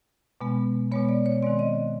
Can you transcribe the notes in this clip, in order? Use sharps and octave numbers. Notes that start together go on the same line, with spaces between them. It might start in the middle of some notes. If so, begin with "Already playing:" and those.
B2 G#3 B3
B2 G#3 B3 C#5
D5
C#5
D#3 G#3 C4 D5
D#5